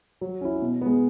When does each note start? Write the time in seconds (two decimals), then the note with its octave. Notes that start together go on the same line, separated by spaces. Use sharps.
0.21 F#3
0.41 C#4 E4
0.62 B2
0.81 G#3 B3